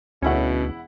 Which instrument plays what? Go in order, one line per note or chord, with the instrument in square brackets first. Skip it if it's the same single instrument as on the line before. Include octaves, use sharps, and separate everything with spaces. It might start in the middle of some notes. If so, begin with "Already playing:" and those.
[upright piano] E1 E4 F#5 [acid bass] D2 [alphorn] B2 [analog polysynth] D3 C#4